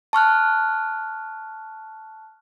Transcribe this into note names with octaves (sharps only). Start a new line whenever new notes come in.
A5 C#6 F6 F#6